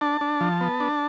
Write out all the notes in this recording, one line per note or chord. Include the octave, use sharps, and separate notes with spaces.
D4 A5
D4
F3
B3
D4